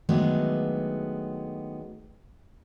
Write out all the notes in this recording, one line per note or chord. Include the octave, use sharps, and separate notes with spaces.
D#3 F#3 G#3 A3 B3 D4